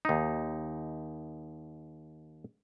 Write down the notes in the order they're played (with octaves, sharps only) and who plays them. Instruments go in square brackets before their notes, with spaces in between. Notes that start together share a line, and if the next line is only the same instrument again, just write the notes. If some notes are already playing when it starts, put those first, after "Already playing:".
[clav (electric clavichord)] D#2 D#4